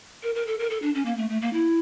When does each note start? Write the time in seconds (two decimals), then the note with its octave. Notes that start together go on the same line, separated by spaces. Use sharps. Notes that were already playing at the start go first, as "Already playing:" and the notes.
0.23 A#4
0.35 A#4
0.47 A4
0.59 A#4
0.70 A4
0.82 D4
0.94 C#4
1.05 A#3
1.17 A3
1.30 A3
1.42 A#3
1.53 E4